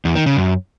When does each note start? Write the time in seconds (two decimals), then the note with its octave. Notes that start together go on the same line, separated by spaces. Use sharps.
0.05 E2
0.16 D#3
0.26 C#3
0.37 F#2